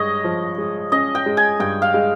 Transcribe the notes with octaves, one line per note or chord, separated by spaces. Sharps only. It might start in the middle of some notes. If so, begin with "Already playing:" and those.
Already playing: G2 G#3 C#5 D#5
F3
G#3
C#4 D#5
G5
G#3
G#5
G2 G5
F5
G#3